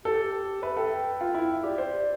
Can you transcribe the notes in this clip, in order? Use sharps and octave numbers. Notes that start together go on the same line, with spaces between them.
G4 A4
B4 E5
A4 G5
F4
E4
G4 D5
C5